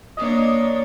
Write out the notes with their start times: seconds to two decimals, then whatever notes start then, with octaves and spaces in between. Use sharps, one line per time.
0.17 A#3 D4 C#5 D#5